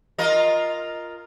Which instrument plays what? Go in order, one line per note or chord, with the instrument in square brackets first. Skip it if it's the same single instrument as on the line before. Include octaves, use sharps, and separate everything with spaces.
[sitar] F4 A#4 D#5